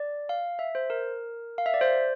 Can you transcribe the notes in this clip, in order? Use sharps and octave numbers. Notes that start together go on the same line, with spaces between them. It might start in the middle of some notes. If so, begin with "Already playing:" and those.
Already playing: D5
F5
E5
C5
A#4
F5
E5
D5
C5